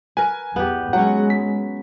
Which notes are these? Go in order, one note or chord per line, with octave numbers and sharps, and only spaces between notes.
A#4 B4 G#5
E2 B3 G4
F#3 G#3 C#4 F#5
B6